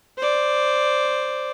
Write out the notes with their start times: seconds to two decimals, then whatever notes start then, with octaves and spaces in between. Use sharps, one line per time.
0.18 C5 D5